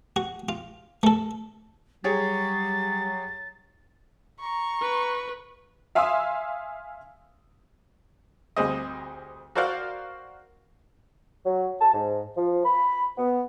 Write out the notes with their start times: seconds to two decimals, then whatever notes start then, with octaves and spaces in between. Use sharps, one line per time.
0.16 F#4
0.49 F4
1.03 A3 A4
2.04 F#3 G3 G4 G#4 C#5 A6
4.40 A#5 C#6
4.81 B4
5.95 E5 F5 G#5 C6 D#6 E6
8.56 D2 G3 C4 G#4 D#5
9.55 F#4 A#4 C5 D5 F5 F#5
11.45 F#3
11.80 A5
11.94 G#2
12.36 F3
12.65 B5
13.17 B3